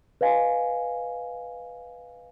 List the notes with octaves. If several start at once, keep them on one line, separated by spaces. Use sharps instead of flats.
B4 D#5 F5 G#5